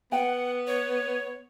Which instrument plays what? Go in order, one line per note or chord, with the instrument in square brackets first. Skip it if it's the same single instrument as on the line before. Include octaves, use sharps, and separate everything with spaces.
[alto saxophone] B3 [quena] F#5 [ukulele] G5
[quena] C#5